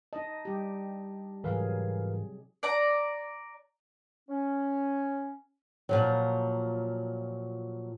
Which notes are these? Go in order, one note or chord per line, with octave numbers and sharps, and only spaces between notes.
D#4 D#5 A5
G3 G4
G#2 C3 E3 F#3 G#4 A#4 B4 F5
D5 A#5
C#4
A#2 F3 F#3